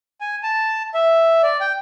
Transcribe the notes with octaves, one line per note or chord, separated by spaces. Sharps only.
G#5
A5
E5
D5
G5